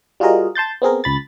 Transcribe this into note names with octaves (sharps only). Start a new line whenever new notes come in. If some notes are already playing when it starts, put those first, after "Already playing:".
G3 F4 F#4 G#4 A#4 D#5
A5 C6 G6 A6
B3 C4 G#4 A#4
C#2 B5 A6